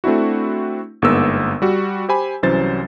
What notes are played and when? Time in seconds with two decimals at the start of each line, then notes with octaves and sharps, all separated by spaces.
0.04 A3 C4 D4 E4 F#4
1.02 G1 G#2 A#3 B3 A#4 E6
1.62 G3 F#4
2.09 G4 C5 G#5 B5
2.43 C2 E3 F#3 C#4 C5 A6